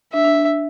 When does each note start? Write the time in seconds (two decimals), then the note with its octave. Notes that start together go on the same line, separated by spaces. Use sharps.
0.13 D4 E5
0.25 D4
0.35 D4